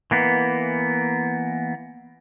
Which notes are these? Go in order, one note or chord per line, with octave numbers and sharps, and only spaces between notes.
E3 A#3 B3